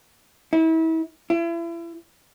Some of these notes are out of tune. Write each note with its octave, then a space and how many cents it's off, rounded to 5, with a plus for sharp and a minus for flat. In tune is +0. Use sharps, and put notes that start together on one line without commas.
E4 -35
E4 +35